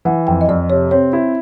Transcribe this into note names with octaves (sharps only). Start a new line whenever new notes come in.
E3 F#5
F2 G5
D#5
F2 D5
C3 C#5
C4 C#5
E4